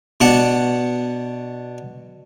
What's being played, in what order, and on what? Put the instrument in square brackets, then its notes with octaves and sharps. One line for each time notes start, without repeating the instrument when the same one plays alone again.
[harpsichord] B2 D4 F#5